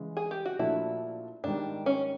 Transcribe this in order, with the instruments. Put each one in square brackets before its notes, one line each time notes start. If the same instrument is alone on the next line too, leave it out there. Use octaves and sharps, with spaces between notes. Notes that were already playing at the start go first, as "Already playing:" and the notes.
Already playing: [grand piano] C#3 E3 G#3
[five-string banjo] G#4
G4
F#4
[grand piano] A#2 F3 A3 D4 F#4 [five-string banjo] E4
[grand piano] G#2 D#3 G3 [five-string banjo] D4
[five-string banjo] C#4